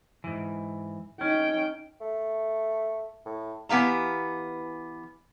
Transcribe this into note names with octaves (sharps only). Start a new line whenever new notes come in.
G#2 E3
C#4 D#4 G5
A3
A2
E3 B3 G4 F5 A#5